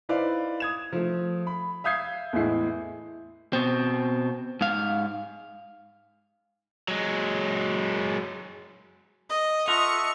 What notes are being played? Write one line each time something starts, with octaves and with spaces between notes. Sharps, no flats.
D#4 E4 B4 C5 D5 F5
D#6 G#6 E7
F3 A3
B5
E5 F5 D#6 G6 G#6 C7
E2 A2 G#3 E4 C7
B2 C4
G#2 F5
F#3 G#3
D#5 D#6
F4 A4 D#5 E5 F#5 A#5 C#6